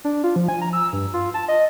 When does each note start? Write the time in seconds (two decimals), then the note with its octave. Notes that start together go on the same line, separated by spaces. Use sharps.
0.05 D4
0.24 F4
0.36 F3
0.49 G#5
0.61 A#5
0.73 E6
0.93 G2
1.14 F4
1.34 A5
1.48 D#5